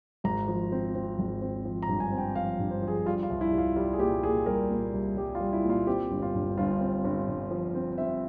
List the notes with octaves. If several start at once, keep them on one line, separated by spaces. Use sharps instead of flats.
G#1 A#5
F3
C4
C4
G#1
C4
F3
A#5
G2
G#5
C4
G5
F3 F5
G2
C5
F3
G#4
G3 F4
F4
C2
E4
C2
F4
G3 F4
G#4
A#2 G4
A#2 G#4
G3 A#4
A#2
C2
G3 G4
F4
G3
E4
A#2
F4
C4 G4
G1
F4
G2
G1 F4
C4
G1
G2
F3
C4
C4 E5